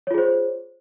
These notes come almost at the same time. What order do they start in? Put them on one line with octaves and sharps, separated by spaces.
C#5 F4 G#4 C5